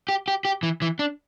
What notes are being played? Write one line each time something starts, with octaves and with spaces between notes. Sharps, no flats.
G4
G4
G4
E3
E3
D4